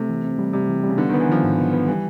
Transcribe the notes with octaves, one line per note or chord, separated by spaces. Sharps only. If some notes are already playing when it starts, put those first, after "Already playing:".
Already playing: C3 A3
E3
C4
G3
C3 G3
E3
G3
C#3
D3 B3
D#3 B3
E3
D#3 F3
G#2
B3
B3
E3 G3